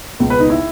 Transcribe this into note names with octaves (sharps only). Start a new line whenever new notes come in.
C#2 B2
B4
D#4
E4